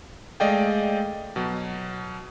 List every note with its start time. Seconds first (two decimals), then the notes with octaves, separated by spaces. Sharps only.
0.40 G#3 A3 D5 D#5 F5 G5
1.36 B2 F#3